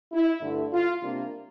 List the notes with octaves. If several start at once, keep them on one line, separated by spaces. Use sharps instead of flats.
E4
G2 D3 A3
F4
C3 G3 A#3 D4